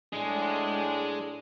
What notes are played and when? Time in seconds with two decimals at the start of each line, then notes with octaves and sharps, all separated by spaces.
0.13 A2 G#3 D4 G#4